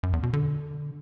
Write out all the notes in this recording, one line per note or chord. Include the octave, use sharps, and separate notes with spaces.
F#2
E2
B2
D3